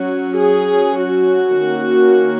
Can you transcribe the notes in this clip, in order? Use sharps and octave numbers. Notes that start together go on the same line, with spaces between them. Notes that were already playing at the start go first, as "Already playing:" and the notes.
Already playing: F#3 C#4 F#4
G#4
F#4
D#3 A#3 C#4